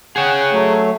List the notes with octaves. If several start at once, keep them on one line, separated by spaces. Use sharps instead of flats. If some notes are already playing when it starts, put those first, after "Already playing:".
G#4 C#5 F#5 G5
F#3 A3